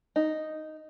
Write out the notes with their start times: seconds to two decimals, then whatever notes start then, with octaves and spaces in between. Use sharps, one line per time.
0.16 D#4